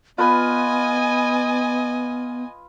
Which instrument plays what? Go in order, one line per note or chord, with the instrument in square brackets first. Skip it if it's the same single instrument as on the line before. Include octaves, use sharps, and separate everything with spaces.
[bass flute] B3 [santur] F4 B4 B5 [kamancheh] D#5 G#5